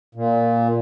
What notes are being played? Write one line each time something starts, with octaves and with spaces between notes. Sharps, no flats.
A#2